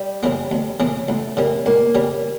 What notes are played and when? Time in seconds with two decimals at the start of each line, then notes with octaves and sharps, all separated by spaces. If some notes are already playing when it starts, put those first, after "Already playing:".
Already playing: G3
0.23 C#3 E3 A#3
0.51 D2
0.80 C#3 E3 A#3
1.08 C#2 A3
1.37 C#3 G3 A#3
1.66 C#2 A#3
1.95 C#3 G3